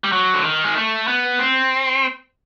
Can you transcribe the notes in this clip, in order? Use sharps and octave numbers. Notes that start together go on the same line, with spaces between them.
G3
F#3
D3
D#3
G#3
A3
B3
C4